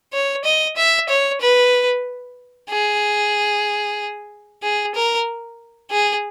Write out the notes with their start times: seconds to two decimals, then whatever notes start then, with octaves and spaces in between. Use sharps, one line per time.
0.13 C#5
0.45 D#5
0.76 E5
1.09 C#5
1.41 B4
2.69 G#4
4.63 G#4
4.95 A#4
5.91 G#4